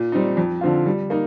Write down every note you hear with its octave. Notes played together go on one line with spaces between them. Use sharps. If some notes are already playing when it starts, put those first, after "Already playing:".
Already playing: A#2
G3 C4 D#4
F2
D3 F3 C4 F4
G3
A#3 D#4